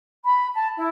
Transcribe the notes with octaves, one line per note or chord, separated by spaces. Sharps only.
B5
A5
E4